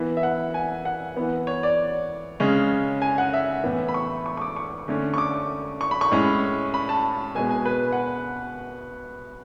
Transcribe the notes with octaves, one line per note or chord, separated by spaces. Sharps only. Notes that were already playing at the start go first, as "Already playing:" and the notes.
Already playing: E3 B3
E5
F#5
G#5
F#5
E3 B3
C#5
D5
C#3 G#3 C#4
G#5
F#5
E5
A2 E3 B3
B5
C#6
C#6
C#6
D6
C#6
D3 A3 C#4
C#6
D6
C#6
B5
C#6
A2 G#3 C#4
B5
A5
B2 G#3 B3 G#5
G#5
B4
F#5